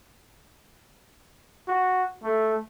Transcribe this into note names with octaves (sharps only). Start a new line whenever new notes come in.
F#4
A3